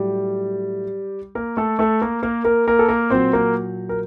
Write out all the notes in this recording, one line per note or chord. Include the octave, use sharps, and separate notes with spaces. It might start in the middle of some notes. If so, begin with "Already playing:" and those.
Already playing: A2 F#3 G3 G4
A#3 A#4
A3 A4
A3 A4
A#3 A#4
A#3 A#4
A#3 A#4
A#3 A#4
A4
A#3 A#4
A#2 F#3 C4 C5
A#3 A#4
A#4